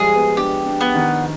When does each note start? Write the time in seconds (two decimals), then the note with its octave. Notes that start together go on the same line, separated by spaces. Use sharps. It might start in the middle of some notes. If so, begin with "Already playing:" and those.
Already playing: F3 G3 G#3 F4 G#4
0.15 B3
0.37 D4 G4
0.66 D4
0.81 B3
0.95 D#3